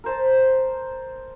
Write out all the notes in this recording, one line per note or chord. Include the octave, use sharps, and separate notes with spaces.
A#4 C5 A5